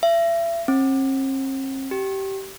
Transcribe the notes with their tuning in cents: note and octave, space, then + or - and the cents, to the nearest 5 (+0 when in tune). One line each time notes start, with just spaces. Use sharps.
E5 +35
C4 +45
G4 -20